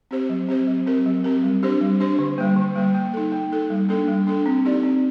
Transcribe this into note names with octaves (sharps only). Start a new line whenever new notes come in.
C4 G4 C5
F#3
C4 G4 C5
F#3
C4 G4 A#4
F#3
C4 G4 A#4
G3
D4 G4 C5
G3
D4 G4 C5
D3
G3 A#3
D3
G3 A#3
A#3
D#4 A4
A#3
D#4 A4
G3
A#3 D4 A4
G3
A#3 D4 A4
C4
D#4 G4 D5
C4